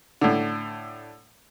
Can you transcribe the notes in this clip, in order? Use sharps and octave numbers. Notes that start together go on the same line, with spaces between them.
A2 D3